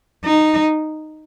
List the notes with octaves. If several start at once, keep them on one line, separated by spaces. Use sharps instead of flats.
D#4